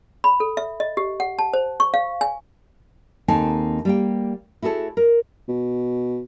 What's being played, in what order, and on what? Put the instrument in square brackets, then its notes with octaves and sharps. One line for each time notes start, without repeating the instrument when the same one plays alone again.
[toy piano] B5
A4
E5
D#5
G4
F#5
A5
C5
C#6
F5
G#5
[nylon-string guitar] D#2 C4 D#4 A4 G#5 A5
G3 A#3 G5
E4 F#4 G#4 A4 C#5
A#4
[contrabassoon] B2